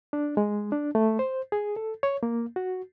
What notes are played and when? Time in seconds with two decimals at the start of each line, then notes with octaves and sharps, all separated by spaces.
0.13 D4
0.37 G#3
0.72 D4
0.95 A3
1.19 C5
1.52 G#4
1.76 A4
2.03 C#5
2.23 A#3
2.56 F#4